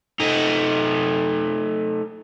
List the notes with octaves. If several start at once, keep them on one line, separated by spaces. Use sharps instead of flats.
A3 D#4